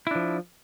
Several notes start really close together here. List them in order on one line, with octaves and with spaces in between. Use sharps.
E4 D4 F3